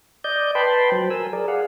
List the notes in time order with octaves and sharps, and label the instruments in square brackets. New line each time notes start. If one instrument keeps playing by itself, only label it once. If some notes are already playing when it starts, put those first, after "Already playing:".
[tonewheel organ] D5 D#5 G6
B4 G5 A5 B5 C6
F#3 C5
A#4 G#5 E6
G#4 A#4 D5
G#4 F5 F#5